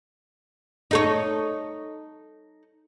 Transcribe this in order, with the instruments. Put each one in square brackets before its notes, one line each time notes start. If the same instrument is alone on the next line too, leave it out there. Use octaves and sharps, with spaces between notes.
[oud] D#4 A4 C#5